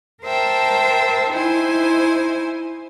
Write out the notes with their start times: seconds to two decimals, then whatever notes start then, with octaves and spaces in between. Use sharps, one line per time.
0.24 A#4 C5 E5 G5 A5
1.32 D#4 E4 C5 G#5